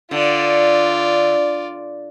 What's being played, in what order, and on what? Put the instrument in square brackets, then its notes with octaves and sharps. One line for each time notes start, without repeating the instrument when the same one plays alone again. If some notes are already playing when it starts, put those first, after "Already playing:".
[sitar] D3 [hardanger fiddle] F4 D5